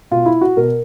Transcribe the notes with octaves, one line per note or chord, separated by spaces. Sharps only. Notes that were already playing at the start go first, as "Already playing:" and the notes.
B2 F4
E4
F#4
B2 A#4